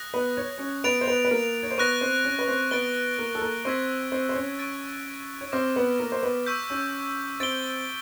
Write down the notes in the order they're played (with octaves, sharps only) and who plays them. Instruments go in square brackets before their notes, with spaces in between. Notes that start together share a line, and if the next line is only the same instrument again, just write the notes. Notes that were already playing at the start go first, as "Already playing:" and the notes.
Already playing: [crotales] D#6 F#6 A#6
[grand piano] B3 B4
C#5
C#4 C#5
[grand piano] B3 B4 [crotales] A6 D7 F7
[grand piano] C5
B3 B4
B4
A#3 A#4
C#5
C5
[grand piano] B3 B4 [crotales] C#6 F#6 A#6
[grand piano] C4 C5
C#4 C#5
B4
C4 C5
[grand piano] B3 B4 [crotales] A6 D7 G7
[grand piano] A#3 A#4
A4
A#3 A#4
[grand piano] C4 C5 [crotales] C#6 E6 G#6 B6
[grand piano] C4 C5
C5
C#4 C#5
[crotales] C#6 F#6 A6 D7
[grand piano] C#5
[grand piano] C4 C5 [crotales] D6 F6 A#6
[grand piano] B3 B4
A#3 A#4
C5
B3 B4
[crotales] C#6 E6 G6 B6
[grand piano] C#4 C#5
[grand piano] C4 C5 [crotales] A6 D7 G7